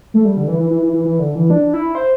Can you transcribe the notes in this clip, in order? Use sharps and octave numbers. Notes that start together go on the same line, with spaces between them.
A3
G3
D3
E3
E3
E3
E3
E3
E3
D3
E3
D4
E4
C5